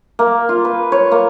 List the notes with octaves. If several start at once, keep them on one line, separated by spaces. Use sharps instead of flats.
A#3
F4
B4
C#5
A#3